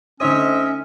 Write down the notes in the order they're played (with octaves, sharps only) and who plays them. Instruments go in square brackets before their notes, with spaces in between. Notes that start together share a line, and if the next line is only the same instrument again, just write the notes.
[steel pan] D3 D#4 C#5 [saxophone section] C4 D#5 E5 [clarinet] C#4